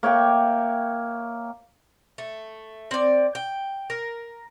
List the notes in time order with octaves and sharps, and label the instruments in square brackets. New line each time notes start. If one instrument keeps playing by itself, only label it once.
[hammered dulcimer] A#3 C#5 E5 G5
[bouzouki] A3
C4 D5
G5
A#4